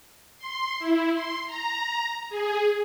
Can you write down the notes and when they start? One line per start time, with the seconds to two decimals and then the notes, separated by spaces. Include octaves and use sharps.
0.38 C6
0.79 E4
1.13 C6
1.47 A#5
2.30 G#4